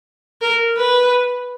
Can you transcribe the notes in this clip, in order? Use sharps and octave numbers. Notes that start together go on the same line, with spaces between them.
A#4
B4